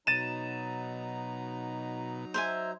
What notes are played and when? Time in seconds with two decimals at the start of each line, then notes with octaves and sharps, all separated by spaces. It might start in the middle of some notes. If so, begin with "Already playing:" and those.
0.07 B2 F#3 D#4 A#5 A6 D#7 E7
2.34 C5 E5 G#5